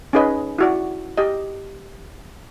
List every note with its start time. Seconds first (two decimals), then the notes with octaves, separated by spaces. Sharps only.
0.13 C#4 D#4 G#4 B4 D#5
0.58 E4 F#4 D5
1.17 G4 D#5